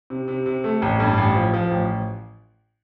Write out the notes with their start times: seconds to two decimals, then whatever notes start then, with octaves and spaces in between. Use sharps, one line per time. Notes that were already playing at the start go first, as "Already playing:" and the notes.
0.10 C3
0.28 C3
0.46 C3
0.64 A3
0.82 A1
1.00 G2
1.18 A1
1.35 F3
1.54 F3
1.71 A1